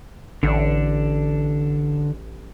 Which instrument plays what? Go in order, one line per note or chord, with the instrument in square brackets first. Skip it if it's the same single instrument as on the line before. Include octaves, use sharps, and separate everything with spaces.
[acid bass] A1 [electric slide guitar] D3 D4